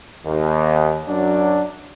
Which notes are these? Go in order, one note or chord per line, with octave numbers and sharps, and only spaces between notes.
D#2
F#2 F#3 D4